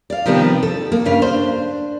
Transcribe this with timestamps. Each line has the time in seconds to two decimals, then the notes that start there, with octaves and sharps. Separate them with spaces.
0.10 D5 F5
0.26 C3 D#3 F3 G3 B3 C4
0.63 A4
0.92 A#3
1.05 G2 C#3 B4 F5
1.22 D4 C5